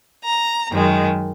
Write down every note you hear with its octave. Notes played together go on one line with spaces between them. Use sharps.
A#5
F#2 D#3 G#3